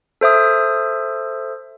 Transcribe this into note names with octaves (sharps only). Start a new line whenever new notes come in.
A4 C5 E5 D#6